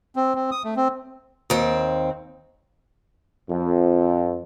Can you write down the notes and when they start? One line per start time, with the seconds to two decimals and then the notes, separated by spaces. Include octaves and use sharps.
0.16 C4
0.35 C4
0.51 D#6
0.64 A3
0.76 C4
1.50 D#2 C4
3.49 F2